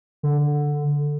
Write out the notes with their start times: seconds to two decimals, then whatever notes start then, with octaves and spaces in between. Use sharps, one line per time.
0.23 D3